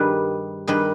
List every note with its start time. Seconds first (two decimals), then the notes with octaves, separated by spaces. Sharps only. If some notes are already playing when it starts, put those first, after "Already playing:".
Already playing: G2 D#3 G3 G#4 B4
0.67 G2 D#3 G3 G#4 B4